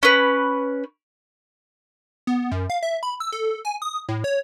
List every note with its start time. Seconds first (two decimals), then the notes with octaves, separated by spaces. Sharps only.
0.03 C#4 B4
2.27 B3
2.52 F#2
2.70 F5
2.83 E5
3.03 B5
3.20 E6
3.32 A4
3.65 G#5
3.82 D#6
4.09 A2
4.24 C#5